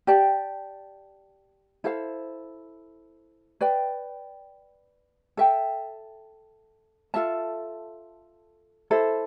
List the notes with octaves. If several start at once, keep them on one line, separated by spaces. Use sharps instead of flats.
G4 D5 A5
E4 A4 C5 F5
B4 D5 G5
A4 E5 G5
F4 A4 E5 A5
E4 A4 C5